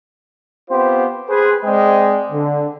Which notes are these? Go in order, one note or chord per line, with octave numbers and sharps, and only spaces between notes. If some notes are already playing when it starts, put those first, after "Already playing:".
B3 C4 F4 G4 C5
G#4 B4 C5
G#3 C4 C5 D5 D#5 G5
D3